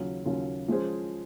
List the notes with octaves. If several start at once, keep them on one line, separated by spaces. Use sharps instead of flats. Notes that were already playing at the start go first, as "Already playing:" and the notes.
Already playing: D#2 C#3 F#3 C#4 F4
D#2 C#3 F#3 C#4 F4
F3 G#3 C#4 G#4 C5